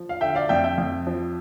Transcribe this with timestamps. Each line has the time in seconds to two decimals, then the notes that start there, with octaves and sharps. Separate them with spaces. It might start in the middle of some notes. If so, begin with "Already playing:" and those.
Already playing: F3
0.09 F5
0.20 D3 E5 G5
0.35 D5 F5
0.49 F2 E5 G5
0.63 E5 G5
0.78 F2
1.07 F3